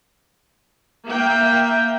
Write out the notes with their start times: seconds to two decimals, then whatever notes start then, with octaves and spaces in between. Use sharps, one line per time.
1.06 A#3 E5 G5